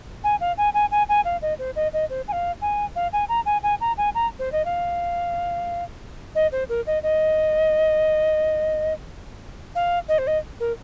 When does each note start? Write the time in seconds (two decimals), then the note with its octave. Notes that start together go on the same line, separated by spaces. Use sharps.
0.24 G#5
0.40 F5
0.57 G#5
0.74 G#5
0.91 G#5
1.09 G#5
1.25 F5
1.42 D#5
1.59 C5
1.76 D#5
1.93 D#5
2.10 C5
2.28 G#5
2.32 F5
2.61 G#5
2.96 F5
3.13 G#5
3.29 A#5
3.46 G#5
3.63 G#5
3.81 A#5
3.98 G#5
4.15 A#5
4.39 C5
4.52 D#5
4.65 F5
6.35 D#5
6.52 C5
6.69 A#4
6.87 D#5
7.03 D#5
9.75 F5
10.08 D#5
10.18 C5
10.27 D#5
10.60 A#4